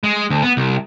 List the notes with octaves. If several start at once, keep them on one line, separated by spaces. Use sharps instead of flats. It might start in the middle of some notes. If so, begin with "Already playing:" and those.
G#3
D2
B3
C2